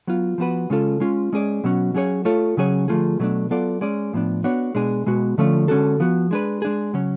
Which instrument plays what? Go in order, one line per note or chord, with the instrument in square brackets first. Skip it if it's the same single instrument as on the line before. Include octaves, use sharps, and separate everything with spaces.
[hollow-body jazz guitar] F#3 B3 F4
F3 B3 F#4 B4
C#3 G#3 C#4 F4 A4
G#3 C#4 F4
G#3 C#4 G#4 D5
B2 F#3 C#4 F#4
F#3 C#4 G#4 C#5
A3 F4 A4 C#5
C#3 F#3 C#4 G#4 C#5
D3 F3 A3 F4 G#4
B2 F#3 A3 D4
F#3 B3 F4 A4 D5
G#3 C#4 G#4 D5
A2 F3 B3 D4
B3 D4 F#4 C#5
B2 G#3 D4 G#4
B2 G#3 B3 F#4
D3 F3 A3 C#4 F4
D3 G#3 C#4 F#4 A4
F3 B3 F#4
G#3 D4 G#4 B4
G#3 D4 G#4
C#3 F#3 C#4